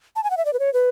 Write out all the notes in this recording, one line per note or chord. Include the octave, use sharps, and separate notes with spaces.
A5
G#5
F#5
E5
D5
B4
C#5
B4